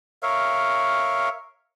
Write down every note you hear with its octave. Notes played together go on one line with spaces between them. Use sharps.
A#4 C#5 E5 F5